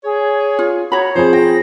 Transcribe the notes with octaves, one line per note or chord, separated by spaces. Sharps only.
G#4 C#5
F4
F#4 C#5 A#5 B5
F3 C4 G#4 C5
G5 A#6